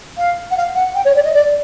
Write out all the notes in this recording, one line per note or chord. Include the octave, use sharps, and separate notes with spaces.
F5
F#5
F5
F#5
G5
C#5
D5
D#5
D5